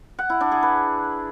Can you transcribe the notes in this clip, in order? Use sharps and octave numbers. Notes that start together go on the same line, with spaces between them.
F#5
E4
D4
G#4
B4